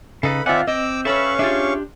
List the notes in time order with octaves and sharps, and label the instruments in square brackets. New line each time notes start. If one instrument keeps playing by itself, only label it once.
[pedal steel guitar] C#3 D#4 [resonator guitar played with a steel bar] A4 B4 [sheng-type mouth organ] B5
[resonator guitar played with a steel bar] D#3 G#5 [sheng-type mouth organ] C4 D5 E5 [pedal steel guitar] F4 F#5
[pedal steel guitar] C4 [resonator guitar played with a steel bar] D#5 [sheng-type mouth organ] D6 E6
[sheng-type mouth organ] C#4 F5 C#6 [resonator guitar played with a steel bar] A4 B4 C#5 [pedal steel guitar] E5 B5
[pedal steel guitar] D4 G4 [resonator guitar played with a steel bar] F4 G#4 E5